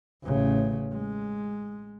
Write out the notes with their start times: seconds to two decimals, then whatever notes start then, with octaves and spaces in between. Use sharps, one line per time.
0.23 A1 C#3
0.92 G#3